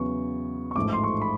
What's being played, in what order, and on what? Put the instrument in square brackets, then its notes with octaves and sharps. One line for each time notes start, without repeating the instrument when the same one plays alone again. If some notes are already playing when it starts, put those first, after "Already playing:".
Already playing: [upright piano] E2 C#3 F#3 B3 C#6
C#6
A1 G#2 F3 A3 D6
C6
C#6
B5